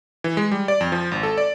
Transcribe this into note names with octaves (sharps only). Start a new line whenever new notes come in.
E3
G#3
G3
D5
F2
F3
G#1
A4
D5